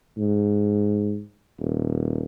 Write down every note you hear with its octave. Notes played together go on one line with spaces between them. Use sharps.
G#2
D#1